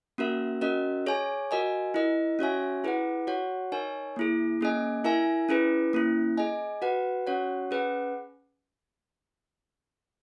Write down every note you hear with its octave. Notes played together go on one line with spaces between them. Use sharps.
A#3 C#4 F#4 A#4 E5
C#4 F#4 A#4 D#5
G#4 C#5 G#5
F#4 A#4 D#5 G#5
E4 A#4 D#5
C#4 F#4 C#5 E5 G#5
E4 G#4 B4 F#5
F#4 C#5 F#5
D#4 A#4 C#5 G#5
A#3 E4 G#4
A#3 C#4 G#4 D#5 G#5
E4 A#4 E5 G#5
C#4 E4 G#4 B4
A#3 C#4 E4
G#4 D#5 G#5
F#4 B4 F#5
C#4 F#4 C#5 F#5
C#4 G#4 B4 F#5